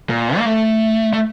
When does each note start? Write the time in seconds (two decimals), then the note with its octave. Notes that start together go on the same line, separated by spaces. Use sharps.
0.09 A#2
0.38 A#3
0.45 A3
1.13 A3